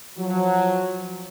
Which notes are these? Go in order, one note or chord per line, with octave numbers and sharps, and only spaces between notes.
F3 F#3